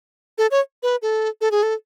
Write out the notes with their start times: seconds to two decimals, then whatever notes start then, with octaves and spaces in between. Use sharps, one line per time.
0.38 A4
0.51 C#5
0.83 B4
1.02 A4
1.41 A4
1.51 G#4
1.63 A4